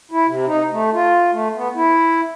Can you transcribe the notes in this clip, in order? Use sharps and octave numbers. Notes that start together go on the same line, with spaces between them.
E4
C3
D#4
A3
F4
A3
B3
E4